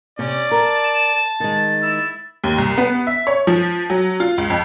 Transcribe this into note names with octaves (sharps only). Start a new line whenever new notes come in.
C3 C#4 D5
A#4 A5
E7
D#3 G#3 A6
E4 E6
D#2
C2
B3
E5
C#5
F3
F#3
F4
C#2
F2